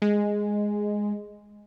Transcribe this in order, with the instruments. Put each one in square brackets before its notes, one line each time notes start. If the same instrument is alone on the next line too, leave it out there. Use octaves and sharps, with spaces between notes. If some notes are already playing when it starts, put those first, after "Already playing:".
[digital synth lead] G#3